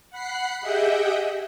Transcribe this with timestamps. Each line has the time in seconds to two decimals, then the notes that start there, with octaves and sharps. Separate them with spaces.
0.10 F#5 B5 F#6 C7
0.61 G4 G#4 D#5 E5 F#5 G5